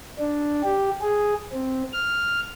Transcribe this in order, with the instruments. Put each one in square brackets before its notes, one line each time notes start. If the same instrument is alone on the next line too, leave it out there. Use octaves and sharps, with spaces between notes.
[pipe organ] D4
G4
G#4
C4
F6